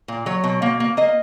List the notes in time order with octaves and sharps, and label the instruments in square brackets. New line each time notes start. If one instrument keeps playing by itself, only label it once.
[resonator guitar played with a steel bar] A#2
F#3 C#5
B2
A#3
A#3
A#3 D#5